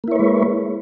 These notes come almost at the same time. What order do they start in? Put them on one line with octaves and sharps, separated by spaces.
A#3 E4 C#5 B4 G#3